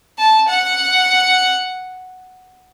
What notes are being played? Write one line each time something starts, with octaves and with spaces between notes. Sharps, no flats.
A5
F#5